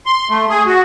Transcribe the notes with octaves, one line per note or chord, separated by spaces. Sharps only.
C6
A3
G#4
F#4